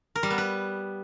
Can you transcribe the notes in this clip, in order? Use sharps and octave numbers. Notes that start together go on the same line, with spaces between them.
A#4
G3
B3
B4